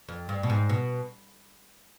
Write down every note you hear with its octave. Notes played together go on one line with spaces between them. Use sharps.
F2
G2
B2
G#2
B2